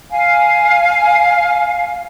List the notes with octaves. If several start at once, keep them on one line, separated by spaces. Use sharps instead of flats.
F5 G#5